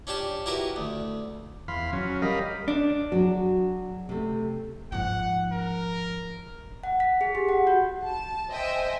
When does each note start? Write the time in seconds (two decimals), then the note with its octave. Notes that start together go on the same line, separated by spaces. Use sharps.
0.07 C#4 D4 G4 A5
0.46 E4 F#4 G4 A#4 B4 E5
0.76 D2
1.68 E2 F5 B5 C6
1.93 F#3 C#4
2.22 G3 A#4 D#5 F5 B5
2.68 D4
3.12 F#3 F#4 G#4
4.09 C3 A3
4.92 G#2 F3 F#5
5.52 A#4
6.84 F#5
7.00 B6
7.21 G#4
7.35 G4
7.49 F#5
7.67 F#4
8.04 A5
8.51 C5 D#5 E5 G5 G#5